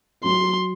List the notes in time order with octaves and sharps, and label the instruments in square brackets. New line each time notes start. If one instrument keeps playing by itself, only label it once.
[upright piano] F#3 [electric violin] C6